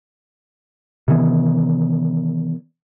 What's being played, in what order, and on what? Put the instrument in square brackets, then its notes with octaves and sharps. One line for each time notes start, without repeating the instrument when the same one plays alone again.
[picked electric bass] C3 D#3 E3 B3